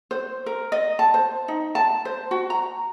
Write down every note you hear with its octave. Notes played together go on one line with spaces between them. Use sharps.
C5
A#4
D#5
A5
C5
D#4
A5
C5
F#4
A#5